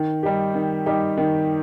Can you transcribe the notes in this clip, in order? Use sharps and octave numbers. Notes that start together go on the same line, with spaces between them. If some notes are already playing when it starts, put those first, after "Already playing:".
Already playing: D#3
G3 D#4 G4
D#3
G3 D#4 G4
D#3